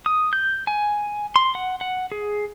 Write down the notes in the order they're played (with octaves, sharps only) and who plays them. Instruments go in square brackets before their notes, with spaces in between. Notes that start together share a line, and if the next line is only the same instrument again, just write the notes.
[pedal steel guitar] D#6
G6
G#5
C6
F#5
F#5
G#4